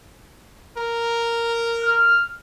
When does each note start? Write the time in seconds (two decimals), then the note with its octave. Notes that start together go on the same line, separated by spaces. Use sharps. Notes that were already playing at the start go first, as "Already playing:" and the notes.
0.77 A#4
1.83 F6